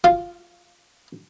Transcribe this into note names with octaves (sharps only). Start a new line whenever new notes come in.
F4